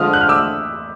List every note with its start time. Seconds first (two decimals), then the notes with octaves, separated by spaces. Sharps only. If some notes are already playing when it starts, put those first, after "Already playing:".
Already playing: D3 F3 G#3 D#6 F6
0.13 F#6
0.21 F6
0.29 D6 E6